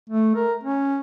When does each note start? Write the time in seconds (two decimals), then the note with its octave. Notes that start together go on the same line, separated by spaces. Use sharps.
0.09 A3
0.35 A#4
0.64 C#4